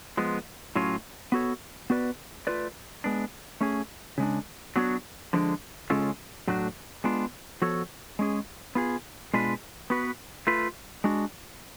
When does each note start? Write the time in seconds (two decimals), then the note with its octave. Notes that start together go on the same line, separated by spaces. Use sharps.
0.17 F3 G#3 B3
0.75 A2 F#3 C#4 F4
1.32 B3 F#4 A4 C#5
1.90 B3 F#4 B4 D5
2.47 A3 F4 B4 D5
3.04 G#3 B3 D4
3.61 A3 C#4 G#4
4.18 C#3 G#3 D4
4.76 F#3 B3 D4 F#4 C#5
5.33 D3 F3 G#3 D4
5.90 C#3 G#3 C#4 F4 A4
6.47 A2 F#3 A3 D4 F#4
7.04 G#3 B3 D4 F4
7.62 F3 B3 F#4 A4 C#5
8.19 G#3 C#4 G#4
8.75 B3 F4 G#4
9.34 B2 G#3 D4 F4 B4
9.90 B3 F#4 B4
10.47 A3 F4 B4
11.04 G#3 D4 F#4